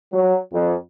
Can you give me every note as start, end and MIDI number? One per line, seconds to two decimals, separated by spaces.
0.13 0.38 54
0.53 0.75 41